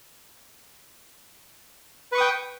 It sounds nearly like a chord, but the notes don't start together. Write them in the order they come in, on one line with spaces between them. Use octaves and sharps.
B4 C#6 D#6 G5